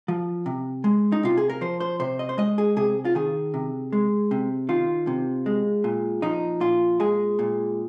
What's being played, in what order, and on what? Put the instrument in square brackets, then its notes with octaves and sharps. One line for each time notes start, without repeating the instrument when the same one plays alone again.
[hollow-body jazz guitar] F3
C3
G#3
D#4
C3 F4
G#4
A#4
F3 C5
C5
C3 C5
D#5
C5
G#3 D#5
G#4
C3 G#4
F4
D#3 G#4
C3
G#3
C3
D#3 F4
C3
G#3
A#2
F3 D#4
A#2 F4
G#3 G#4
A#2